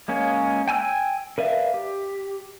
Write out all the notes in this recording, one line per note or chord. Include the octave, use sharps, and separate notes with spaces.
G#3 A#3 C#4
G5 G#5 A#5 E6 F#6
A#4 B4 D5 E5 F5
G4